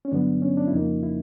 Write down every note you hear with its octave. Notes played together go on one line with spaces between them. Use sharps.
C#4
G2 D3 F#3 B3 D4
C#4
D4
E4
F2 C#3 F3 A#3 D#4
E4